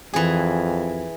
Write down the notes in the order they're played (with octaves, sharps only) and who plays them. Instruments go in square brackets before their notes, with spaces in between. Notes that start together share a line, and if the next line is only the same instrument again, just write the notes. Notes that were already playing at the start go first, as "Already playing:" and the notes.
[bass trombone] F2 [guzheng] E3 G#4